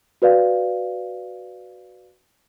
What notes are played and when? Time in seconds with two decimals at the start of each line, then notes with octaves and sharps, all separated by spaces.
0.22 F#4 B4 D5 F5